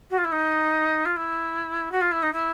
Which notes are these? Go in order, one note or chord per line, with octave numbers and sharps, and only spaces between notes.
F#4
F4
E4
D#4
F4
E4
F#4
F4
E4
D#4
E4